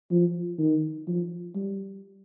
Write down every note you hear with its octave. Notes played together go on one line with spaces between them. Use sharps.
F3
D#3
F3
G3